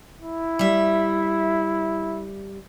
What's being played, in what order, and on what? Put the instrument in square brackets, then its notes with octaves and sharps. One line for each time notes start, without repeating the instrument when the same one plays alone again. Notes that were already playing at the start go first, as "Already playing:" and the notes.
[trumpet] E4
[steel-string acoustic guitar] G3 E5